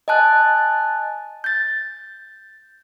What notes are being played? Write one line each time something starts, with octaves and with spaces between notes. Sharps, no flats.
D#5 G#5 A5 F#6
G6 A6